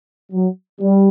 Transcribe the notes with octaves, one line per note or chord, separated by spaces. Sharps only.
F#3
G3